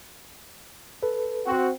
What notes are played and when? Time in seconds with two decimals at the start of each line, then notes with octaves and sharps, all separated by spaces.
1.03 A4 B4
1.46 C4 F#4